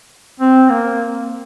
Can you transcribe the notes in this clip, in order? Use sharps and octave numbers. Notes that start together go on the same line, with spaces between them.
C4
A#3